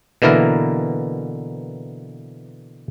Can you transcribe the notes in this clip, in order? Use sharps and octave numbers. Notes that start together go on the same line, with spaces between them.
B2 D3 E3 A#3 E4 A#4